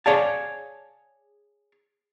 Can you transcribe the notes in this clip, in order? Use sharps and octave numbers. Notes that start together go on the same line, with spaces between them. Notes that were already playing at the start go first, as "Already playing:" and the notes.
G#4 C#5 D5 F5 A5